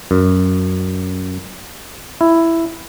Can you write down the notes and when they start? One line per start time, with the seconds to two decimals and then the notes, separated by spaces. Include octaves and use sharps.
0.11 F#2
2.21 E4